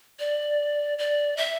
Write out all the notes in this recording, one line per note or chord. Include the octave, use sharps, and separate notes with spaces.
D5
D5
E5